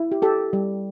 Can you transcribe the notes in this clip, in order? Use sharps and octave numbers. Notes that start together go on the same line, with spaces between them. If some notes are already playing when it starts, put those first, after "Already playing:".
Already playing: E4
G4
G4 A4
G3